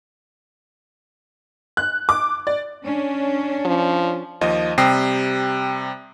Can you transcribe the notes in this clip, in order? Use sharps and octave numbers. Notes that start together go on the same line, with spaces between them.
F#6
D6
D5
C#4 D4
F3
D#2 F3 D#5
C3 G3 G5 D#6 A#6 C7